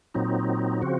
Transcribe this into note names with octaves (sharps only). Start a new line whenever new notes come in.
A#2 F#3 C4 D#4
C#3 F3 C4 F#4